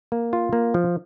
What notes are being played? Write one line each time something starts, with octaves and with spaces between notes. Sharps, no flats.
A#3
F4
A#3
F3